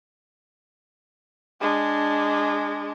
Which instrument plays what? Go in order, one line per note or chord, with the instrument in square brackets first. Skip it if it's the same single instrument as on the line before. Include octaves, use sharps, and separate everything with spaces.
[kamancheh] G#3 D4